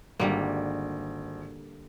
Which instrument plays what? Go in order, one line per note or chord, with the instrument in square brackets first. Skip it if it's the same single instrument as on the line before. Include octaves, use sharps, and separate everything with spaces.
[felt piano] G#1 [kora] D3 G3 A#3